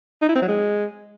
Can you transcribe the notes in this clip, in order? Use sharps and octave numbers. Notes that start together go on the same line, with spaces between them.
D#4
E4
C4
F#3
G#3